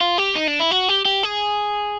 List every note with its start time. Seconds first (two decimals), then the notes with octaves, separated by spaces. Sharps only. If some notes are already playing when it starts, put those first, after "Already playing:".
0.01 F4
0.18 G4
0.35 D#4
0.47 D4
0.60 E4
0.71 F#4
0.89 G4
1.05 G4
1.23 G#4